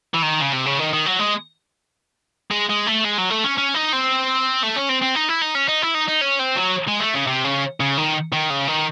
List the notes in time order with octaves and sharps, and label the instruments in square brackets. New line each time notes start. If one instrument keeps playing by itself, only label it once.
[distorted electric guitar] E3
D#3
C#3
C3
C#3
D#3
D#3
F#3
G#3
G#3
G#3
A3
G#3
F#3
A3
C#4
C#4
D#4
C4
A3
C#4
C4
C4
D#4
E4
D#4
C#4
D#4
E4
D#4
D#4
C#4
C4
F#3
G#3
A3
C#3
C3
C#3
C#3
D#3
D#3
C#3
D#3